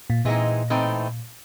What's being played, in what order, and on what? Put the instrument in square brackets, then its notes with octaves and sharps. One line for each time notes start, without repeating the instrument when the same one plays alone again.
[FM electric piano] A#2
[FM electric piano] A#2 [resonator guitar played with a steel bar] E3 G#3 C4 D#4
[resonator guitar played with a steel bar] A2 E3 A3 C4 D#4